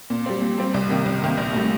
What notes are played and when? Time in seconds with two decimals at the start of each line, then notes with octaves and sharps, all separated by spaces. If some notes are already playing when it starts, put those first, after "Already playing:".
0.10 A#2
0.26 G3 C4
0.42 A#2
0.58 G3 C4
0.74 C2
0.90 C3 D#3 A#3
1.06 C2
1.22 C3 D#3 A#3
1.38 A#1
1.54 A2 G3